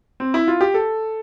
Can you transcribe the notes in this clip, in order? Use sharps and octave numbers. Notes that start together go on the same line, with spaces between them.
C4
E4
F4
G4
A4